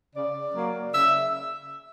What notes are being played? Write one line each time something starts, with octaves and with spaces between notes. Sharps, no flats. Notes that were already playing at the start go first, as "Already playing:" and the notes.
C#3 D5
F#3 A#3
C#3 E5